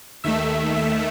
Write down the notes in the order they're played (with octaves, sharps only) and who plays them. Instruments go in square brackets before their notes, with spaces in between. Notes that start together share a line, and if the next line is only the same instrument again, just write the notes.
[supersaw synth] D#2 D#3 A3 E5
E5